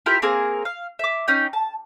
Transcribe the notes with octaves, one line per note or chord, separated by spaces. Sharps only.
E4 F4 G4 A#4
A#3 C4 G#4 A#4
F5
E5 D6
C#4 D#4 G5
A5